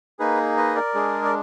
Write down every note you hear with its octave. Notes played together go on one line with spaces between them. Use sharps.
A#3 D#4 G#4 B4
B4 D#5
A#4 D5
G#3 D4 G#4
D5